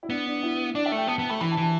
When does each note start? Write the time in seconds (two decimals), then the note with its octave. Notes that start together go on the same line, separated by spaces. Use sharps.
0.03 E4
0.10 B3 D4
0.27 D4
0.43 E4
0.75 D4 D5
0.86 E5
0.92 A3
0.97 G5
1.07 B3 A5
1.19 B3 A5
1.30 A3 B5
1.41 E3 B5
1.52 A5
1.57 E3
1.63 A5